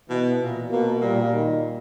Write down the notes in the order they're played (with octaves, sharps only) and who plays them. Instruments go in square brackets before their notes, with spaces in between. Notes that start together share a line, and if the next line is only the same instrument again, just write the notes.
[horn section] B2 [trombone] E3
[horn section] A#2
[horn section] B2 [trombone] A#3
[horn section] A#2 [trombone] G3
[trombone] D#3